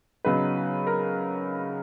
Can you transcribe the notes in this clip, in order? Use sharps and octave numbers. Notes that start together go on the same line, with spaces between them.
C#3 F#3 B3 D#4 B4
A#4